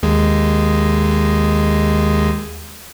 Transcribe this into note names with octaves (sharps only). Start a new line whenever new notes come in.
D#2 G#3